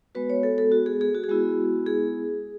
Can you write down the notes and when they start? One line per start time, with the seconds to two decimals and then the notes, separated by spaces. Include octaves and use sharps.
0.15 G#3 B3 F#4 B4
0.30 C#5
0.43 A4
0.58 A4
0.72 F#4
0.86 G#4
1.01 G#4
1.15 F#4
1.24 G#4
1.29 G#3 B3 E4 F#4
1.87 G#4